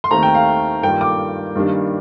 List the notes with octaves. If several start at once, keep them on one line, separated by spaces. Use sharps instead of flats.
C6
D#2 D#3 A3 C4 A#5
G5
F5
G2 D#3 A#3 F4 G5
D6
G2 D#3 G3 A#3 D4